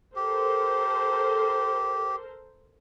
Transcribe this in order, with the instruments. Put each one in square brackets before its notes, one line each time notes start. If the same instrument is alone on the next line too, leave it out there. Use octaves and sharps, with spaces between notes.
[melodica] G4 [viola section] A4 A#4 C5